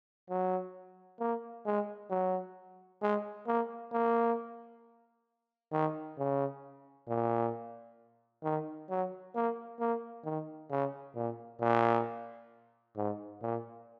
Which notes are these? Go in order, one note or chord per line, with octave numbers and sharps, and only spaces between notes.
F#3
A#3
G#3
F#3
G#3
A#3
A#3
D#3
C#3
A#2
D#3
F#3
A#3
A#3
D#3
C#3
A#2
A#2
G#2
A#2